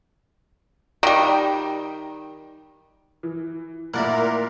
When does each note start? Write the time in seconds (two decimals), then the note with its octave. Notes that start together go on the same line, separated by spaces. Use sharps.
1.03 D#3 G3
3.23 E3
3.94 A#2 A3 A#3 E4 A#4 D5 F#5